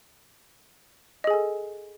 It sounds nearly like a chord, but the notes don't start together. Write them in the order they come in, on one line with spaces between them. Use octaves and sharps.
D#5 G#4 G#5 A4